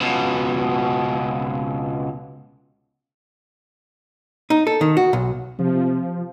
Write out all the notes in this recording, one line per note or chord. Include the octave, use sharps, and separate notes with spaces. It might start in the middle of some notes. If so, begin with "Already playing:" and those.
C#2 B2
D#4
A4
D#3
F#4
B1
C3 F3